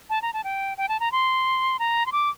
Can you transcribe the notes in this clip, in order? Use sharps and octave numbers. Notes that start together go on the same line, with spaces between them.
A5
A#5
A5
G5
G5
A5
A#5
C6
A#5
C6
D6